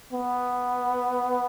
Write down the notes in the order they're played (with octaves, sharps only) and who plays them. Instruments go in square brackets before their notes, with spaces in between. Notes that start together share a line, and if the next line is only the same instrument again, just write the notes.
[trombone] B3